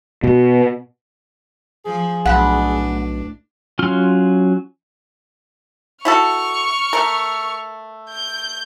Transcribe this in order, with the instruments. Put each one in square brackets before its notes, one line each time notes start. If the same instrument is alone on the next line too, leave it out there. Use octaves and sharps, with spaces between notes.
[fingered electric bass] B2
[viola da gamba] F3 [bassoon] G#4
[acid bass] B1 [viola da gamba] A2 D4 [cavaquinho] F#5 B5
[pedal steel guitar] F#3 C#4 F4 C6 F6
[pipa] E4 F#4 A4 [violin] C#6 F6
[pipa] A3 A#4
[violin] G6